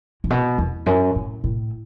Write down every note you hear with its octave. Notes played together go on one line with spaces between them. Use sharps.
A2
B2
E2
F#2
A2
A2